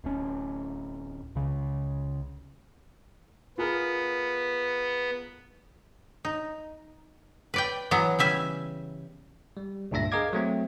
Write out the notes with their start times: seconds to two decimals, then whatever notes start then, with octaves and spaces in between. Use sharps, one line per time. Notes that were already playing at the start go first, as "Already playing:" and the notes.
0.04 D1 C#4
1.35 C#2 C#3
3.58 B3 F4 G#4 A#4
6.25 D#4
7.54 B4 D5 G5
7.91 E3 F#3 B3
8.19 C#3 G3 E5 G#5
9.57 G3
9.91 C#2 G2 A#2 D4 E5 A#6
10.12 G#4 A#4 D#5 F5 D6 G#6
10.33 F#3 A3 C4